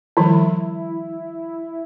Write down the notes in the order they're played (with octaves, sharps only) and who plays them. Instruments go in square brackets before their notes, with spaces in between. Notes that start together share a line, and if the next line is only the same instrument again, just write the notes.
[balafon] D#3 F3 G3 [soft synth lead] E4